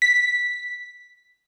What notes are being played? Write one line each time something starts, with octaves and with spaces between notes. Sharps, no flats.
B6